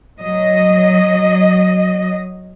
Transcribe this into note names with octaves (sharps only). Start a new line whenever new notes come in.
F#3 D#5